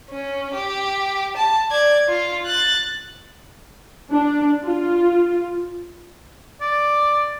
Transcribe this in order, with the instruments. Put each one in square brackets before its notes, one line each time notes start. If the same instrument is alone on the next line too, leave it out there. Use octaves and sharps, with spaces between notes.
[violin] C#4
G4
A5
D5 G#6
F4
F#6 A6
[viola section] D4
F4
[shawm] D5